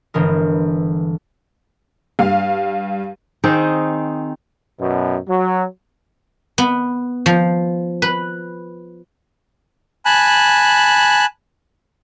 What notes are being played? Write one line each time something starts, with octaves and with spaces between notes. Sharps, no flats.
G1 E3 G#3 A#4
G2 F5
D#3 C4 D#4 G#4
F#2 B2
F#3
B3
F3
B4
G#5 A5 B5 F#6